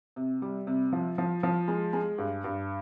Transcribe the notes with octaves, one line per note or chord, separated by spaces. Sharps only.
C3
G3
C3
F3
F3
F3
G#3
G#3
G2
G2